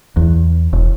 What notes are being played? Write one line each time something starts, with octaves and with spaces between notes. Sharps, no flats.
E2
E1